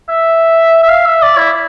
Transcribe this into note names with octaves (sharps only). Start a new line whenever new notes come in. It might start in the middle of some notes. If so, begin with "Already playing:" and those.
E5
E5
F5
E5
D5
E4